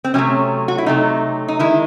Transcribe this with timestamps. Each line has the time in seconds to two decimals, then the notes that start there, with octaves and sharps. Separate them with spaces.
0.04 C4
0.14 C3 F#3 A3 C#4
0.68 F#4
0.78 E4
0.86 C3 F#3 A3 D#4
1.48 D#4
1.59 D#3 G#3 E4